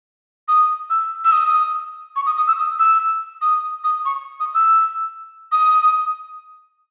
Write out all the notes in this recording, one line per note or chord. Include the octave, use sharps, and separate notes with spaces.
D#6
E6
E6
D#6
C#6
D#6
D#6
E6
D#6
E6
D#6
D#6
C#6
D#6
E6
D#6